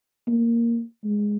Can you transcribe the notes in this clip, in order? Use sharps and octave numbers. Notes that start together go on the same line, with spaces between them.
A#3
G#3